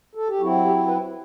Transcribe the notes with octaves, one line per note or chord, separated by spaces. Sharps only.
A4
G4
F#3 C4 E4 F#4
G4
B4